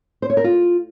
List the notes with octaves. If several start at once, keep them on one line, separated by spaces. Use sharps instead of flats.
C5
C#5
A#4
F4